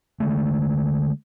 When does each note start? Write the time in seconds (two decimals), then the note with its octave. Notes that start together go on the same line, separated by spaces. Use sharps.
0.20 D3 G#3 A3